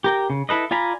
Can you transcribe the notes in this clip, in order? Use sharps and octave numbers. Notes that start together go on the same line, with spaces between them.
G4 A#4 G5
C#3
E4 A4 B4 D#5
F4 D5 G#5 A#5 B5